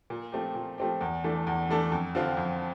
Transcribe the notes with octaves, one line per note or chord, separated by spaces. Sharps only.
A#2
F3 A3 C4 G4
A#2
F3 A3 C4 G4
E2
E3 A3 D4 A4
E2
E3 A3 D4 A4
F2
D3 F3 C4 F4
F2